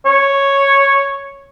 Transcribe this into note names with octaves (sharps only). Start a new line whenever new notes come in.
C#5